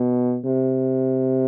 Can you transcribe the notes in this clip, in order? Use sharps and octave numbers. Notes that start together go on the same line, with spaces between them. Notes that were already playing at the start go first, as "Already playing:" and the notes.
Already playing: B2
C3